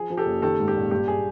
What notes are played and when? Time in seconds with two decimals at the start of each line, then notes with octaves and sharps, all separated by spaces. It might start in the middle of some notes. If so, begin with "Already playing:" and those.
Already playing: F3 G#4
0.10 F3
0.17 G4 A4
0.26 F#1
0.42 D#3 G4 A4
0.60 G#2
0.68 G4
0.76 A#1
0.91 G2 G4
1.08 G#4